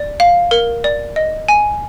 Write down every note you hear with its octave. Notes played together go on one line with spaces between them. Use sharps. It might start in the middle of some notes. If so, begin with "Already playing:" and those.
Already playing: D5
F5
A#4
D5
D#5
G#5